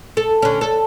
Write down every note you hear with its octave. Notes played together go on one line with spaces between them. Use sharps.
A4
D3 C#4
A4